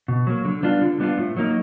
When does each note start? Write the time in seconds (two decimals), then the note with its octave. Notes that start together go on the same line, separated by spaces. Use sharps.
0.08 B2
0.27 F#3 A#3
0.45 D3
0.63 G3 B3 D4 F4
0.82 D3
1.00 G3 B3 D4 F4
1.18 A2
1.36 F#3 A#3 D#4